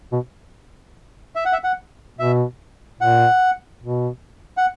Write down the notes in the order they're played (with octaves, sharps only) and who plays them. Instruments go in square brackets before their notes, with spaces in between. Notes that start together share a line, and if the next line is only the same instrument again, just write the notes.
[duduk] B2
[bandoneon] E5
F#5
E5
F#5
[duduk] B2 [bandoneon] E5
[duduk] A#2 [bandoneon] F#5
[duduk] B2
[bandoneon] F#5